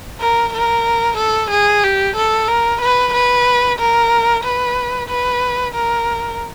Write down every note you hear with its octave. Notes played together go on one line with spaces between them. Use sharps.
A#4
A#4
A4
G#4
G4
A4
A#4
B4
B4
A#4
B4
B4
A#4